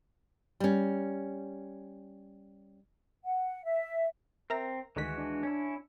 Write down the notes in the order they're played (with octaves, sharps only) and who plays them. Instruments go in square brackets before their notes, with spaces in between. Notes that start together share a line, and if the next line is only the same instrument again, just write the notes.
[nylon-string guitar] G3 C#4
[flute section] F#5
E5
[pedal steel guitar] C4 [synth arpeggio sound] A#4 E5 A#5
[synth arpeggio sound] D2 D#3 B6 [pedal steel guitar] E3 G#3 F#4
[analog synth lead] D4
[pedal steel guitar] C#4 E4